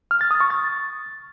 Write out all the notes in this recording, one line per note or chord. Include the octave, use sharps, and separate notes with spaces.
F6
A6
D#6
C#6
A6